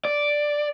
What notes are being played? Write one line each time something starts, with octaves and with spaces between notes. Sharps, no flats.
D5